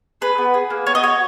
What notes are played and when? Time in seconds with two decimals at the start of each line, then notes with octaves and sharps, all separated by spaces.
0.21 G#4 B4
0.38 B3
0.54 G#4
0.70 A#3
0.87 B3 C#5
0.95 D#5
1.03 F#4 C#5